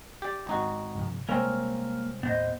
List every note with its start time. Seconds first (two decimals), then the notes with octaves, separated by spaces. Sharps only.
0.22 G4 D5
0.47 G#1 D#4 F#4
0.95 G2 C3 F3
1.29 C3 G3 G#3 A#3 C4 C#4 A#4
2.23 D#2 A2 B3 C5 D#5